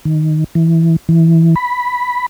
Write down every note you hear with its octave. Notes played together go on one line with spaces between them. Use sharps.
D#3
E3
E3
B5